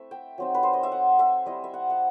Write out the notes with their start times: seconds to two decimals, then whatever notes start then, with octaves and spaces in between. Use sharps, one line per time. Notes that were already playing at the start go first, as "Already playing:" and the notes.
Already playing: A3 C4 E4 E5
0.11 G5
0.38 F#3 C4 D#4
0.54 B4
0.63 C5
0.73 D#5
0.83 E5
0.92 F#5
1.19 E5
1.46 G3 C4 E4 D#5
1.64 E5
1.74 F#5
1.90 F#5